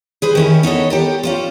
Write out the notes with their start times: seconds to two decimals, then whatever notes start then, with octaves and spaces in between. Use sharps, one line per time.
0.22 G#4 B4 C5
0.35 D#3 C#4 E4
0.63 B3 D#4 A4 C#5
0.90 G4 A4 A#4
1.23 C#4 F4 C5